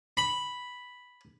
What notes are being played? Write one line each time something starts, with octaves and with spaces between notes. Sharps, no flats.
B5